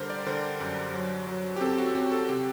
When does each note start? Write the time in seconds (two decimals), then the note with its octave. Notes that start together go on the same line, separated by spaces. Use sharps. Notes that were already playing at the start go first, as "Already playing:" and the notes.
Already playing: D3 G3 G4 A#4 C5
0.10 D5
0.26 D3 C5
0.60 F#2
0.94 F#3
1.27 F#3
1.56 G4
1.61 C4 A4
1.78 F#4
1.95 C4 G4
2.12 A4
2.28 C3 G4